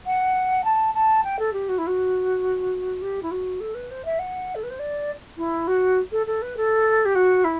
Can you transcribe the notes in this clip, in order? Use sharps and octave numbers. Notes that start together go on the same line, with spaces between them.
F#5
A5
A5
G5
A4
G4
F#4
E4
F#4
G4
E4
F#4
A4
B4
C5
E5
F#5
A4
B4
C5
D5
E4
F#4
A4
A4
B4
A4
G4
F#4
E4